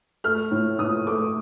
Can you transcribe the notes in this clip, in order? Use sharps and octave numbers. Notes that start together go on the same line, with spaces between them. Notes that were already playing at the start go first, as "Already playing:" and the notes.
A3 F6
A2
A2 D#6
A3 D6